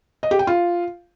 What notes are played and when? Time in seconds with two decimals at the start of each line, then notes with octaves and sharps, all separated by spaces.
0.23 D#5
0.31 G4
0.39 G5
0.47 F4